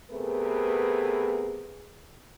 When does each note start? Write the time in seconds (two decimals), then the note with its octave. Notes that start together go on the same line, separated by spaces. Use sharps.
0.12 C3 A3 B3 G#4 A#4 B4